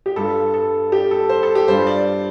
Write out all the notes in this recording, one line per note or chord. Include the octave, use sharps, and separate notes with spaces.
G4
G2 G3 F4 A4
A4
G4
A4
C5
A4
G4
G2 G3 F4 C5
D5